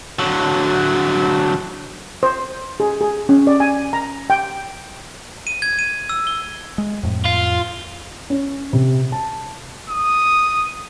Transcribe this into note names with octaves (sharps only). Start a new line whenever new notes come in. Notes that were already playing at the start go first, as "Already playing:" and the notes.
D3 F#3
C5
G#4
G#4
C#4
D5
G#5
A#5
G5
D#7
G#6
D#7
E6
G7
G#3
F2 A2
F4
C#4
C3
A5
D#6